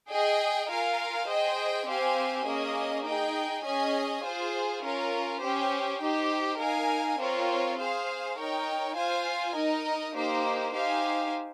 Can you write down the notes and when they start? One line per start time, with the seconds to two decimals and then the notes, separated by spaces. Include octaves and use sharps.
0.10 G#4 D#5 G5
0.69 F4 A#4 F5 G#5
1.29 G#4 C5 D#5 G5
1.87 C4 G4 C5 F5 G#5
2.47 A#3 C#4 G#4 D#5
3.06 D#4 G#4 D#5 G5
3.65 C#4 G#4 D#5 G#5
4.25 F4 G#4 C5
4.83 C#4 F4 A#4 F5
5.43 C#4 G4 C5 G5
6.01 D#4 G4 C5
6.60 D#4 A#4 F5 G#5
7.19 C4 F4 A#4 C#5
7.79 G#4 C5 F5
8.38 D#4 A#4 C#5 G5
8.97 F4 C5 F5 G#5
9.56 D#4 A#4 D#5
10.15 A#3 D#4 G4 C5
10.74 D#4 G4 C5 F5 G#5